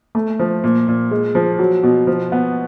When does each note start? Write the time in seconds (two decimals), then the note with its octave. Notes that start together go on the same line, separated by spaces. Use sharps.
0.15 A3
0.39 F3
0.64 A#2
0.88 A#2
1.11 G#3
1.35 F3
1.59 F#3
1.83 B2
2.07 F3
2.32 B3